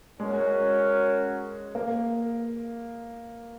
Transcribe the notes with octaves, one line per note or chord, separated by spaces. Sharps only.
G#3 C#4 F#4 A#4
A#3